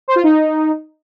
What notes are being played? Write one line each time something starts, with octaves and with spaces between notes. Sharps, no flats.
C5
F4
D#4